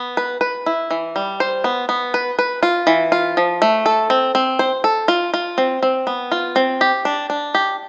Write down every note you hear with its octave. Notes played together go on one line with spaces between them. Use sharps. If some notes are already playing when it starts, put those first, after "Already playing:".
Already playing: B3
B4
B4
E4
E3
G3
C5
B3
B3
B4
B4
F4
E3
F4
F3
A3
A4
C4
C4
C5
A4
F4
F4
C4
C4
B3
F4
C4
G4
D4
D4
G4